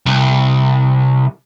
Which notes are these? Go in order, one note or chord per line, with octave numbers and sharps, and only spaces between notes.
C2